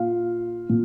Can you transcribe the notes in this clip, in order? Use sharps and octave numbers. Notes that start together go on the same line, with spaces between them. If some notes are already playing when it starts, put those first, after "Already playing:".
Already playing: A#2 F4 F5
A#2